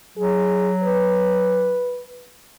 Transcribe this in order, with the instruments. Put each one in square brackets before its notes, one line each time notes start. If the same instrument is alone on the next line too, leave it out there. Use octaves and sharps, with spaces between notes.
[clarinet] F#3 [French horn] G#4
[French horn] B4